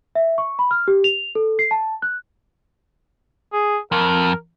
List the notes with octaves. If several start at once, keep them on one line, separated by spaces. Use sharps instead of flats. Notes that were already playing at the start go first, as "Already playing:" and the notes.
E5
C#6
B5
F6
G4
F7
A4
C7
A5
F#6
G#4
F2 A#4